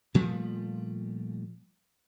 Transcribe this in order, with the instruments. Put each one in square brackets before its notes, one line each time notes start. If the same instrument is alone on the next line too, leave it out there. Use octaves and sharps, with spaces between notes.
[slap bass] A#2 F3 G3 A3